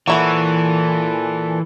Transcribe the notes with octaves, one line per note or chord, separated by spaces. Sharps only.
A#2 E3 F#3 E4 F#4 A4